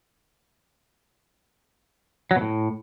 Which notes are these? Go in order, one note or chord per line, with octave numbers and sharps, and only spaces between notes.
F#3
B2
A2